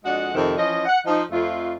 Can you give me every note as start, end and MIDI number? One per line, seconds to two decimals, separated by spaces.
0.04 0.30 41
0.04 0.30 56
0.04 0.30 62
0.04 0.30 66
0.04 0.30 75
0.04 0.30 78
0.35 0.55 41
0.35 0.55 48
0.35 0.55 51
0.57 0.83 52
0.57 0.83 53
0.57 0.83 61
0.57 0.83 75
0.86 0.98 78
1.05 1.22 53
1.05 1.22 63
1.31 1.75 41
1.31 1.75 57
1.31 1.75 65